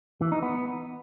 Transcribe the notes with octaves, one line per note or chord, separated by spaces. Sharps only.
E3
D#4
B3